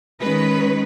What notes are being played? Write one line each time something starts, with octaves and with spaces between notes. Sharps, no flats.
D#3 G#3 C#4 B4